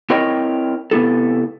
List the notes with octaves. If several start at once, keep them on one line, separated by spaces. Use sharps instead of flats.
C4 E4 A#4 C#5 D#5 G5
C3 B3 E4 A4